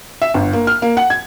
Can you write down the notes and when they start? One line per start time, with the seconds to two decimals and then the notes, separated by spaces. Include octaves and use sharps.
0.22 E5
0.34 G1
0.53 A#3
0.67 F6
0.82 A#3
0.97 F#5
1.10 G#6